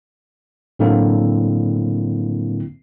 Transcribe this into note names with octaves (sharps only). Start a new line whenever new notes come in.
A2 D3 F#3 A#3 C4 E4